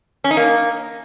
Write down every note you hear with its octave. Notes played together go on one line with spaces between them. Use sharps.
C#4
D#4
A#3